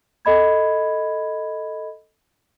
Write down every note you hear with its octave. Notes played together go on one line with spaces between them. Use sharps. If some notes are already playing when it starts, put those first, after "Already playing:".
A4 D#5 B5 G#6